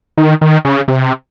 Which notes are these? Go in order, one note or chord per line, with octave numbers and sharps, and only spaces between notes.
D#3
D#3
C#3
C3